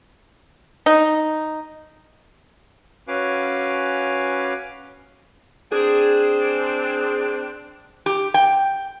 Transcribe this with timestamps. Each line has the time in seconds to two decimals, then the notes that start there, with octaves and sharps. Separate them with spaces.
0.86 D#4
3.08 C#4 F#4 B4 F5 G#5 D6
5.72 C4 D4 G#4
8.06 G4
8.34 G5